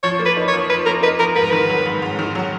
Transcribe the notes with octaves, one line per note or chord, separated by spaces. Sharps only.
F3 C#5
A#3
B4
D#4
C#5
F3
F3 B4
A#3 A#4
D#4 B4
F3 A#4
G#2 B4
A#4
D#3 B4
F#3
G#2
G#2
D#3
F#3